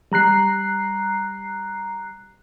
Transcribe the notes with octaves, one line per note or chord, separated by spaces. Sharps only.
G3 A#5 F#6 C7